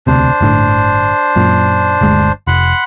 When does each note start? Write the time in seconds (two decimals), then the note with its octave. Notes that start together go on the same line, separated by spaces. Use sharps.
0.07 E1 D2 C3 D4 C5
0.41 G1 A2 D3
1.36 F#2 A#2
2.01 G1 D2 G#3
2.47 F1 F#5 B5 C6